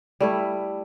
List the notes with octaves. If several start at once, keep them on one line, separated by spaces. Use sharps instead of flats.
G3 A3 E4